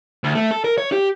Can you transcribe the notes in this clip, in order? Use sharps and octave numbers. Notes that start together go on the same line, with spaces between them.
D2
A3
A4
A#4
C#5
G4